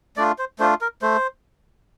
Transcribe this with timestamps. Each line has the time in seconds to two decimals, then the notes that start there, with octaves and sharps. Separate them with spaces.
0.17 A3 D4 F4 D5
0.38 C5
0.59 A3 D4 F4 C5
0.81 A#4
1.02 A3 C5